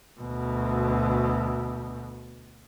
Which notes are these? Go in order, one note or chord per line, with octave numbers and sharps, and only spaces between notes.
D2 B2